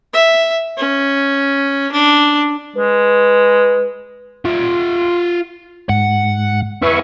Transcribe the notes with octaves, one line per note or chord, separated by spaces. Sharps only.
E5
C#4
D4
G#3 B4
F4 E5
G#2 F#5
E4 G#4 B4 E5 C#6